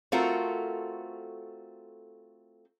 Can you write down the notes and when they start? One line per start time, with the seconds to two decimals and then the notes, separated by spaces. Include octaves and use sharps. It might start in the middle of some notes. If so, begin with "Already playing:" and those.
0.12 A3 C4 F4 F#4 A4 A#4